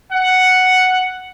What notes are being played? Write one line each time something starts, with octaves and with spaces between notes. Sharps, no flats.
F#5